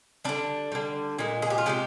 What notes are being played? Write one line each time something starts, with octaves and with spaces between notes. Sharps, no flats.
D3 G3 D4
D3 G3
A#2 G#3
G#4
G4
F4
C3 F3 G#3 G4